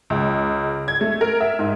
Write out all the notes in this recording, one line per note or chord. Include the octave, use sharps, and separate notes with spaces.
C#2
G#6
A3
A#4
E5
G#2